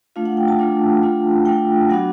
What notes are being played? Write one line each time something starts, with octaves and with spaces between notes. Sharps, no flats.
A3 D4 F4 F5
F#5
G5
A5
A3 D4 F4 A5
A3 D4 F4
A3 D4 F4 G5
F#3 B3 D4 F#4 F#5